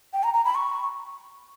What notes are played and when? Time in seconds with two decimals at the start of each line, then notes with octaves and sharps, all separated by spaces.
0.13 G5
0.24 A#5
0.34 A#5
0.45 B5
0.55 C#6